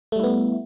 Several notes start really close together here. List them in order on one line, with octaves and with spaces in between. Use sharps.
A3 G3 E4 B3